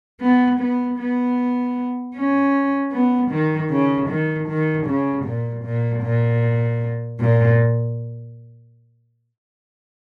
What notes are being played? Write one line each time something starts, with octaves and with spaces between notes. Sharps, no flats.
B3
B3
B3
C#4
B3
D#3
C#3
D#3
D#3
C#3
A#2
A#2
A#2
A#2